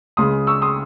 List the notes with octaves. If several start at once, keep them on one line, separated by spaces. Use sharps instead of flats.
C#2 C#3 G#3 C6 D#6
C#6 E6
C6 D#6